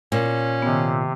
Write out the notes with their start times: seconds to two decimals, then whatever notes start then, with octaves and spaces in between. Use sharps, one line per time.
0.12 A#2 C#4
0.62 C3 D#3 B3